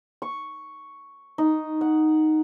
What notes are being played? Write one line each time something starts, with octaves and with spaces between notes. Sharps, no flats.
C#6
D#4
F#5